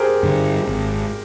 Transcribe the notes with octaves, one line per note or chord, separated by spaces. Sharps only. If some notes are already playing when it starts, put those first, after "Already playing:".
Already playing: G4 G#4 A#4 C5
G2 D3 G3
G#1